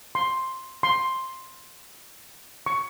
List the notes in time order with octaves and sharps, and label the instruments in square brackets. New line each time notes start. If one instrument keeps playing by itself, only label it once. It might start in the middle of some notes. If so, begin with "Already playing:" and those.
[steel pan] C6
C6
C#6